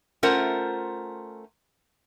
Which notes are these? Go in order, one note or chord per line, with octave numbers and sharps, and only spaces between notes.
A3 C#4 F4 A#4 C5 F#5